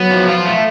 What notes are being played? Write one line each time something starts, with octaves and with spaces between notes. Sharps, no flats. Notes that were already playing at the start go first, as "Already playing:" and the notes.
Already playing: F#3 B3
F3
F4
A3